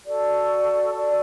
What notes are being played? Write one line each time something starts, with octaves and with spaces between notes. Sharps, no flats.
F#4 A4 D5
F#4 A4 D5